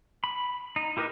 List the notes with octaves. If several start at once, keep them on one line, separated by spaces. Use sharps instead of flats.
B5
D#4
E4 G4 A#4 B4 D#5